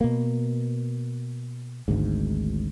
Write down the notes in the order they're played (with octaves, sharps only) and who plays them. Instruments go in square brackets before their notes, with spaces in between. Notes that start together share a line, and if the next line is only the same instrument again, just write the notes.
[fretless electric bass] B2 A#3
G#1 D2 G#2